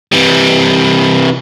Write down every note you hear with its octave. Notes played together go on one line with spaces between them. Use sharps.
C3 E3